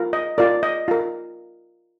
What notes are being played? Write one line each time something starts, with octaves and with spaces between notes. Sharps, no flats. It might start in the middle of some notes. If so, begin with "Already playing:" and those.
Already playing: F4 A#4
D#5
F4 A#4 D5
D#5
F4 A#4